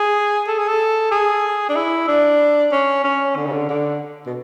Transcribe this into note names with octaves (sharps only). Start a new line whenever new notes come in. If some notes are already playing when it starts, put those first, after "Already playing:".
Already playing: G#4
A4
G#4
A4
G#4
D4
E4
D4
C#4
C#4
D3
C#3
D3
D3
B2